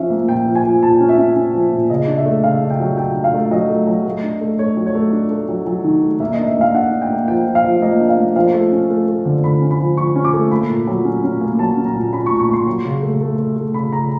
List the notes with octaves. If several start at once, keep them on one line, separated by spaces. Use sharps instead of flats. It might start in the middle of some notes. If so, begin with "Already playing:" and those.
Already playing: F3 C#4 E5
A#3
A#2 G5
F3
G#5
F3
A#2 A5
C#4
E5
C#4
C#4
F3
A#2
C#3 D#5
D4
E5
A3
C#3 F5
D4
G5
F#3
D4 G5
D4
F5
A3
F#3 D#5
A3
F#3
A3
D4
A3
A3 C#5
F#3
C#5
A3
D4
A3
F#3
F#3
D#3
A3
A#3 E5
D4 D#5
E5
A#3 F5
D4 F#5
D4
G5
A#3
F3 G5
F3
F5
F3
A#3 D#5
D4
F5
A#3
F3 F5
A3
C#4
A3
A3
D3
D3 B5
C#4
B5
F3
F3 C#6
C#4
D6
A3
A#3 B5
A#2
F#3
C#4
C#4
A#3
F#3 A5
C#4
A#5
A#2
C#4 B5
C#6
A#2
C#6
A#3 C6
F#3
C#3
A3
A3
A3
A3
C#3 B5
C#3 A#5